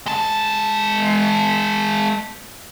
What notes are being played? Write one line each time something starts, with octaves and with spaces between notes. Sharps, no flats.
G#3 A5